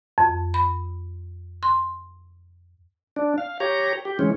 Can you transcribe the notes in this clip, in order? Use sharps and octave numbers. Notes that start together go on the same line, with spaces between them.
F2
B5
C6
D4
F5
G4 C#5 A#5
G4
E3 G#3 C#4